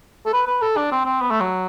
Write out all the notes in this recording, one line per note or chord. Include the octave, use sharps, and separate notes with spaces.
A4
B4
B4
A4
D4
C4
C4
B3
A3
F#3